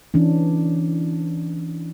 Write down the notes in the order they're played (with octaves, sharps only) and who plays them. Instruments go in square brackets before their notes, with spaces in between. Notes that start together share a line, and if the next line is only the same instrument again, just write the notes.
[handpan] E3 C#4 D4